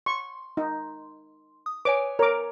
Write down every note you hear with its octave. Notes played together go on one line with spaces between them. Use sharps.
C6 C#6
D#4
D#6
B4 C#5 G#5 D6
A#4 C#5 D6